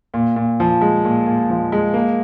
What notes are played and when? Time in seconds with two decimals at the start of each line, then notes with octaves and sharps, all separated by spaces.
0.14 A#2
0.36 A#2
0.60 F3
0.81 G#3
1.05 A#2
1.26 A#2
1.50 F3
1.72 G#3
1.94 A#3